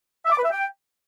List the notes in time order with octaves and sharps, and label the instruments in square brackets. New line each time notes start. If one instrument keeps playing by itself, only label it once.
[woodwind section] E5
D6
B4
E5
G5